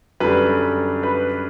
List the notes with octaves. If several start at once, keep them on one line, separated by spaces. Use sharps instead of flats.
F#2 D3 G3 B4 B5
B4 B5